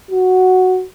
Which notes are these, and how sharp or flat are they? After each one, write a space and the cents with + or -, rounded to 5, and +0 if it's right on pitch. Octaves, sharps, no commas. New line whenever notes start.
F#4 +0